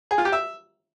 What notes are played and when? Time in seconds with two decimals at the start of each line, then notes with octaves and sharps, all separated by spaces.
0.11 G#4
0.18 F4
0.25 G4
0.32 E5